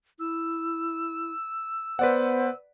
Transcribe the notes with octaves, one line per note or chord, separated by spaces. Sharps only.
E4 E6
B3 B4 C5 D5 F#5